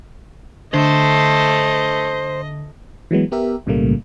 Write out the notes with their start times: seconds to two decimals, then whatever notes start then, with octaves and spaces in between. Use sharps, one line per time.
0.74 D3 A3 C5 D#5
3.11 E3 F#3 G#3 B3
3.32 B3 G4 A#4 E5
3.66 B1 A2 C#3 G3 A3 A#3